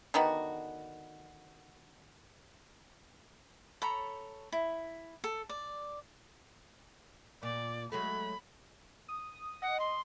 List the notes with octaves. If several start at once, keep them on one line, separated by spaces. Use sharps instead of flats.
D3 D#3 B3 F#4
A4 C#5 A#5 B5
E4
A4
D5
A#2 D5
F#3 G#3 A3 B5
D#6
D#5 F#5
C6